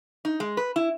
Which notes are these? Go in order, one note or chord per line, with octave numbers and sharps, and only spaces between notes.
D#4
G#3
B4
E4